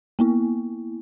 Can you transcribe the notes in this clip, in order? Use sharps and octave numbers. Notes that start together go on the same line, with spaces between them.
A#3 B3 E4